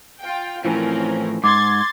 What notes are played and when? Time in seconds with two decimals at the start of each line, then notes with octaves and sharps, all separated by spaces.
0.20 F4 G5
0.65 A2 E3 F3 C4 C#4 A#4
1.44 G#2 C6 D6 G#6 A6